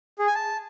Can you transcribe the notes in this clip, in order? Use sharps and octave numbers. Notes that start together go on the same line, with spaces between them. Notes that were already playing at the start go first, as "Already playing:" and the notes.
G#4
G#5
A5